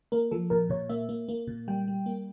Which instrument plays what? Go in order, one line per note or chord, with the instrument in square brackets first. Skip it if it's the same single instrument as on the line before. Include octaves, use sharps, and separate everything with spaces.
[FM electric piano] A#3 A#4
F3 A4
A#2 A#4
A#2 C#5
A#3 E5
A#3
A#3
A#2
G3 G5
G3
A#3